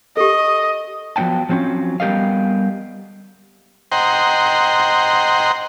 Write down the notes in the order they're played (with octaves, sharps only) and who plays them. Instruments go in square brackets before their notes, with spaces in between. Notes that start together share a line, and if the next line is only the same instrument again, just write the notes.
[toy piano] G4 A4 [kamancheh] D#5
[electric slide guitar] F3 F#3 B3 C#4 G5 A5
F3 F#3 C4 C#4 F4
G3 B3 G4 A#4 D#5 F5
[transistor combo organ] C5 D#5 F#5 G5 A#5 C6